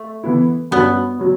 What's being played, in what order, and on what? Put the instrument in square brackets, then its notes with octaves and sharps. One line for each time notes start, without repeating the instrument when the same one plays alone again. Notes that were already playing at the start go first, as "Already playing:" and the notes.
Already playing: [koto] A3
[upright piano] E3 B3 E4
[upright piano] G2 F#3 C#4 [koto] B3
[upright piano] F#3 C#4